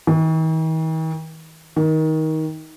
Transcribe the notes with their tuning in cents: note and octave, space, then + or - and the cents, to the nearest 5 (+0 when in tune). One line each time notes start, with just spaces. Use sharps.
D#3 +45
D#3 +20